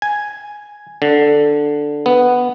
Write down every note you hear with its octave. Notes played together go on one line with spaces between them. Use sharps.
G#5
D3
B3